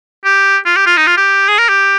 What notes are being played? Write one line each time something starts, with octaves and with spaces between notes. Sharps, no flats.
G4
F4
G4
F4
D#4
F4
G4
G#4
A#4
G4